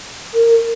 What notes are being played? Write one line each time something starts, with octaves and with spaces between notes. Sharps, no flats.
A#4